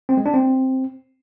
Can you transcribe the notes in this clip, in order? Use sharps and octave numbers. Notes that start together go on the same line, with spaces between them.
C4
G#3
D4
C4